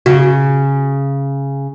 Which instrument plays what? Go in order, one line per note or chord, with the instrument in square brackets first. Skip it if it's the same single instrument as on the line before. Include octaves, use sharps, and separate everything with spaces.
[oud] C#3 [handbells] F#4